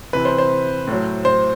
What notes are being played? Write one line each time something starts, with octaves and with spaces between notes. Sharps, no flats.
C3 E3 B4
C5
C5
A2 F#3
C5